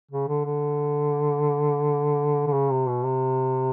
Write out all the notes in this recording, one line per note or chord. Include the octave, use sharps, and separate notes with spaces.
C#3
D3
D3
D3
C#3
C3
B2
C3